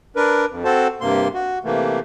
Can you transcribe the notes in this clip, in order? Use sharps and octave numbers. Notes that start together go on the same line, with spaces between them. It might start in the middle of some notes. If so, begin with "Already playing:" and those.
D4 A#4 B4
F2
C4 F#4 A4 C5 A5
G2 C3 A#3 C6
F#4
C3 E3 A3 A#3